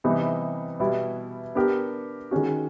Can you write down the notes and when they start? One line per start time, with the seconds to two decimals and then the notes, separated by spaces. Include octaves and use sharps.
0.04 C3 E3 G3 B3 D#4
0.80 B2 G3 B3 E4
1.55 B3 D4 G4 A#4
2.31 D#3 G#3 C#4 F#4